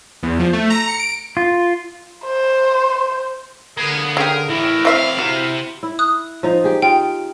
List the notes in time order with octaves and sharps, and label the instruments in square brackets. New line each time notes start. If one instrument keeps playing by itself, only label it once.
[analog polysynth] E2
F3
A3
A#5
C#7
D7
[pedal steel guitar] F4
[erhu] C5
[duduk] D3 [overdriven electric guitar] A#3 B3 [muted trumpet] G#4
[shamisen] C#3 G4 [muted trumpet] G#4 [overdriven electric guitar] A#4
[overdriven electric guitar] A2 E3 [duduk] E4 [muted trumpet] A#4
[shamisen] C4 E5 [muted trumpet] F5
[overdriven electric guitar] C3 [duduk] E4 [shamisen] F#4
[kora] E4
[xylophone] D#6 F#6
[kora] F3 D#4
G4 G#4
[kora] F4 [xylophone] G5